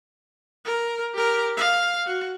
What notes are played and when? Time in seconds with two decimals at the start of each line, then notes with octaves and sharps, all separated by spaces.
0.65 A#4
1.14 G4 A#4
1.57 F5
2.06 F#4